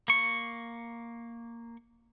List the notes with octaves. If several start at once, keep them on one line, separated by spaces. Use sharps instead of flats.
A#3 C#6